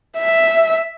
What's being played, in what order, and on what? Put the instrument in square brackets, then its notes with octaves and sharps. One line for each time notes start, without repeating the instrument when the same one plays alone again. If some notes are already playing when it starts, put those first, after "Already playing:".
[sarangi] E5